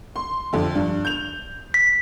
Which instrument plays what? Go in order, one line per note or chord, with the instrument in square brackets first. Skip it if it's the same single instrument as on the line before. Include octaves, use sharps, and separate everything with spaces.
[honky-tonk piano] C6
F2 D3
G2
G6 F7
[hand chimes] B6